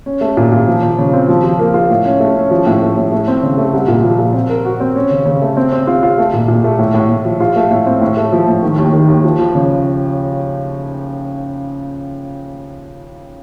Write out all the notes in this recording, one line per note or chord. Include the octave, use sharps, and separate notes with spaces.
C#4
A3
A#2
A#2
F3
F3
C#3
C4
F3
F3
A#3
F4
A2
C#4
A3
C#4
F3
A2
A3
A2
A3
C4
C#3
A3
C2
A#2
F3
A#2
C4
A#4
F#4
C4
C#4
C#3
C#3
A3
C4
C4
F4
F4
A3
A#2
A#2
A3
A2
A2
A2
F3
F4
A3
A2
C4
A2
A3
F3
A2
D#3
D#2
D#3
D#2
F3
F3
C#3